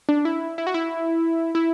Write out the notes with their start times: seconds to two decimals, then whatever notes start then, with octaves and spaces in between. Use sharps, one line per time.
0.09 D4
0.25 E4
0.58 E4
0.67 F#4
0.74 E4
1.55 E4